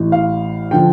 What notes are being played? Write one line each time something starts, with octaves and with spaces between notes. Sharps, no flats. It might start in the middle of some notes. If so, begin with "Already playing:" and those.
Already playing: A1 A2 E3
F5
D3 F3 G5